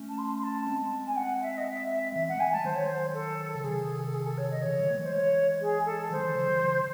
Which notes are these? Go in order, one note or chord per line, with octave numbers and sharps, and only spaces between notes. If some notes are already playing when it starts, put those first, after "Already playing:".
Already playing: A3 C#4
A5
C6
C6
A5
G#3 C4
G#5
F#5
E5
D#5
E5
E5
E3 G#3 E5
F#5
E3 G#3 G#5
A5
G#3
D#3 F#3 C5
C#5
C5
A4
C#3 A4
C3 D#3 G#4
A4
G#4
A4
C#5
D#5
C#3 E3 C#5
D#3 F#3
A3
E3 G#3
C5
C#5
G#4
A4
D#3 F#3 C5
D#3 F#3
C#3 E3
D#3 F#3
C#3 E3